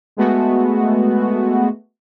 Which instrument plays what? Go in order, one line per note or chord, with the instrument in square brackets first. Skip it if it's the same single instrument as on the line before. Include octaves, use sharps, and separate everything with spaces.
[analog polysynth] G#3 A3 B3 F#4